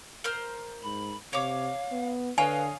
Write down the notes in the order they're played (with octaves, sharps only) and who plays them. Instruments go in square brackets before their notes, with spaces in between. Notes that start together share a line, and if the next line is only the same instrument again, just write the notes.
[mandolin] A#4 C5 F6
[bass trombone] G#2 [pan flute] B5
[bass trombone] C3 [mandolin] C#5 D6 [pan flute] F5
[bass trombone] B3
[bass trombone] D3 [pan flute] B4 [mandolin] C#5 D#5 F5 [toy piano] G#5